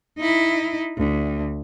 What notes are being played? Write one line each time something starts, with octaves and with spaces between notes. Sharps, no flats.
D#4 E4
D2